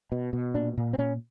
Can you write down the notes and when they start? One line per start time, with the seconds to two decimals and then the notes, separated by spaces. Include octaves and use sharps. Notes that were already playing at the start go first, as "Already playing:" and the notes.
0.12 B2
0.33 B2
0.54 A#2 D4
0.78 A#2
0.93 C4
0.98 A#2 C#4